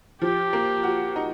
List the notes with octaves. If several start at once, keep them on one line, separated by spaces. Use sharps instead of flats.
F3 G4
A#3
F#4
D#4